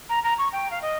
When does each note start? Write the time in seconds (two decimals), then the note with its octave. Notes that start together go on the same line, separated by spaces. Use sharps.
0.09 A#5
0.24 A#5
0.38 C#6
0.53 G5
0.71 F5
0.82 D#5